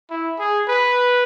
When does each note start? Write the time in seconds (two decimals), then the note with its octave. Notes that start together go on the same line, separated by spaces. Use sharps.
0.10 E4
0.39 G#4
0.68 B4